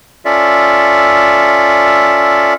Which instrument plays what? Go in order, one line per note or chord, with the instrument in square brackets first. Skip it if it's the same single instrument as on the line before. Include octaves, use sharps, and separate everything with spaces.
[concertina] C#4 F4 A4 D5 E5